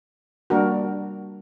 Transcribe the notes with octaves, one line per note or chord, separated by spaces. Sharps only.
G3 A#3 D4 F#4 A#4